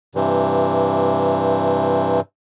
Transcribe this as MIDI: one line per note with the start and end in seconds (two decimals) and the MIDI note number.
0.15 2.20 43
0.15 2.20 48
0.15 2.20 52